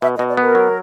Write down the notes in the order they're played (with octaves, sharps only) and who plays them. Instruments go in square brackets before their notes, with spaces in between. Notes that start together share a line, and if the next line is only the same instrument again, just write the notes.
[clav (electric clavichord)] B2 [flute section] E5
[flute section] D#5
[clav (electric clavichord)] B2
[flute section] D5
[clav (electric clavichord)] B3 [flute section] A#4
[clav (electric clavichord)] F#3